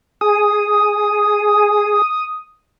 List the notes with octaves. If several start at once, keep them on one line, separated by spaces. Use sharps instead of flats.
G#4 D#6